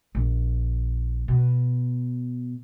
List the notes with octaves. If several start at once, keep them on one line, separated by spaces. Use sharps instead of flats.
A#1
B2